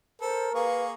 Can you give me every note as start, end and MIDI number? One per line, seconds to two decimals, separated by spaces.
0.21 0.53 69
0.21 0.66 70
0.21 0.50 72
0.55 0.93 58
0.55 0.93 68
0.55 0.83 71
0.55 0.86 77
0.55 0.93 85